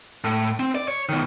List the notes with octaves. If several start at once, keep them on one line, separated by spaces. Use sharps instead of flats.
A2
C4
D5
C#5
B2 D#3